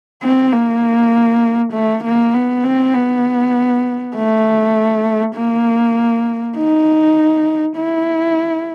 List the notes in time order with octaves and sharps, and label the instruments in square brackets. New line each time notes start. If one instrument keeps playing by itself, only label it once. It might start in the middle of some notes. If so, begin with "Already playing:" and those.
[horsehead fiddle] C4
A#3
A3
A#3
B3
C4
B3
A3
A#3
D#4
E4